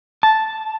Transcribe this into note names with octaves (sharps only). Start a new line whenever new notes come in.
A5